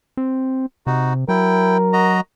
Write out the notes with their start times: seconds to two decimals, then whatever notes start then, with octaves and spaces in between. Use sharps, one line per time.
0.17 C4
0.87 C3 D#4 F#4
1.28 F#3 E4 A#4 G5
1.93 F#4 D#5 A#5